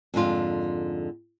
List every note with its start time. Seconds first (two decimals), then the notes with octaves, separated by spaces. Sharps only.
0.14 F2 G#2 D3 F4